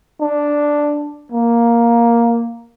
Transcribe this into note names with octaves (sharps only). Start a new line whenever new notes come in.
D4
A#3